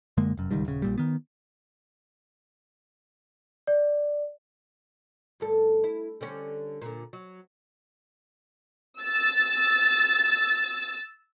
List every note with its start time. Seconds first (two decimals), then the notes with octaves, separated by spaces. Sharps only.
0.17 F#2 D3 G#3 A#3
0.37 F1 F#2
0.51 D1 C#2 D#3 G3
0.66 D#1 C#3
0.82 A#1 A#2 G3
0.98 D#3 B3
3.67 D5
5.40 D2 G2 A4
5.84 E4
6.21 D3 G3 C#4
6.82 A#2 D3
7.13 F#3
8.99 E6 A6